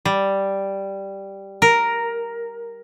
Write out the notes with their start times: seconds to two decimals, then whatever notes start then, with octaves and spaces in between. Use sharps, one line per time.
0.05 G3
1.62 A#4